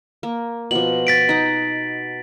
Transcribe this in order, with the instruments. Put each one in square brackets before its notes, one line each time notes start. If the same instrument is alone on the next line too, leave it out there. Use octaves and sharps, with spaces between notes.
[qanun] A#3
[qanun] B2 F3 [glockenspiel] F#7
[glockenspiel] A6 B6 D7
[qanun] D#4 F#5